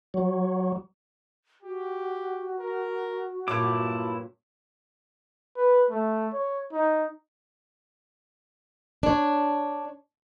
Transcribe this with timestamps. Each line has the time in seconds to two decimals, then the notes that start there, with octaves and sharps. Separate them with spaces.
0.14 F#3
1.63 F#4 G4
2.59 A#4
3.48 G2 A#2 F#3 E4 A5 D6
5.57 B4
5.90 A3
6.33 C#5
6.73 D#4
9.03 D4 C#5